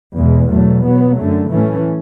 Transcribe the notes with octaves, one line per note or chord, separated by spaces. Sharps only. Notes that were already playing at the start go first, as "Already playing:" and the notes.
E2 B2 G#3
E2 B2 F#3 A3
B2 F#3 B3
F#2 D3 A3
A2 E3 A3 C#4